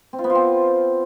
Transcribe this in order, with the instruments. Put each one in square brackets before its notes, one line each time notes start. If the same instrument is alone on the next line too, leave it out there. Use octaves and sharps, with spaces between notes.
[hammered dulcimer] C4
F4
B3
F4
C4